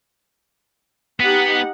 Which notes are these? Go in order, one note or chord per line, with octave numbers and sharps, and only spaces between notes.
B3 D#4 G4 F#5